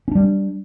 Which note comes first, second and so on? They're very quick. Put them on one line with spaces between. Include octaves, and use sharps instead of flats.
C#4 D4 G3